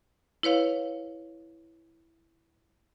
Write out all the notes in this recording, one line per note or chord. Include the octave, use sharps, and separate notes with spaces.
E4 B4 C#5 F5